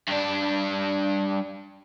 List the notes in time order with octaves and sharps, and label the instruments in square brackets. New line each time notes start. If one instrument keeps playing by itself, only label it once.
[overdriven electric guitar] G2 D4